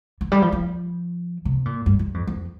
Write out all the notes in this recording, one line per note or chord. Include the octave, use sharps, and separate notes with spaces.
E3
G3
F3
F3
C3
A#2
G2
G2
F2
F2